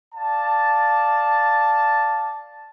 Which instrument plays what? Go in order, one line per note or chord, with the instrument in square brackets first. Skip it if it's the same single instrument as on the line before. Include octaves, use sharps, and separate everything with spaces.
[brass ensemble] D5 F5 A5